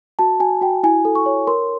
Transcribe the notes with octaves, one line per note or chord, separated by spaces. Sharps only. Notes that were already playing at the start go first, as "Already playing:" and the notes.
F#4 A5
F#4 G#5
F#4 G5
E4 G#5
A4
C#6
C#5
A#4 C6